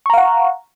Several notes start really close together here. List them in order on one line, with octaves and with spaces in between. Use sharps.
C#6 A#5 F5 F#5